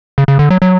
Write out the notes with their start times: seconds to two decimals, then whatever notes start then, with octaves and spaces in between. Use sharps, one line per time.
0.18 C#3
0.28 C#3
0.39 D3
0.50 F#3
0.62 F#3